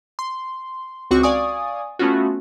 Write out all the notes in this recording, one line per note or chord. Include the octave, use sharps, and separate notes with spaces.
C6
C#2 C4 F#4 C#6 D6
D5 F5 G#5 C#6 D#6
A3 B3 C#4 F4 F#4